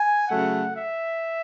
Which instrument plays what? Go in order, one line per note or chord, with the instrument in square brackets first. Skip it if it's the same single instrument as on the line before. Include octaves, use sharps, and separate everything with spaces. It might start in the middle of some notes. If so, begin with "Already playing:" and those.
Already playing: [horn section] G#5
C#3 F#3 A3 F#5
E5